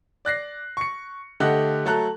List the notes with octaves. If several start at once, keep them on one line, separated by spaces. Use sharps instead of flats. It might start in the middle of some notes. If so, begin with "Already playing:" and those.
D5 F#6 A#6 C7
C#6 C#7
D3 A3 G4 D#5 F#5 F#6
F#3 A3 A4 A#5 F#6